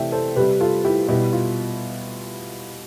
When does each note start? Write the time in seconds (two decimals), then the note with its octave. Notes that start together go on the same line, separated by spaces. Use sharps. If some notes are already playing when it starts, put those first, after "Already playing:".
Already playing: C3 E3 A3 E5 G5
0.12 A4 C5
0.36 C3 G3 G4 B4
0.60 F4 A4
0.85 E4 G4
1.08 B2 G3 E4 G4
1.33 F4